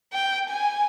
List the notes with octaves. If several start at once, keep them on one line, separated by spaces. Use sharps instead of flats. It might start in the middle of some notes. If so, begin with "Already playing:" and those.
G5
G#5